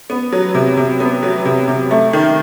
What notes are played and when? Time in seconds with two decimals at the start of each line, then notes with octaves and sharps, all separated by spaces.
0.10 B3
0.32 F#3
0.55 C3
0.77 C3
1.00 B3
1.23 F#3
1.45 C3
1.68 C3
1.91 A3
2.13 D#3